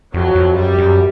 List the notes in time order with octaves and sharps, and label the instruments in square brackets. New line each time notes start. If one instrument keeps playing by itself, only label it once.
[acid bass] F2 [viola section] F#3
[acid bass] F2
[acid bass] F#2 [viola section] G3
[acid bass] F#2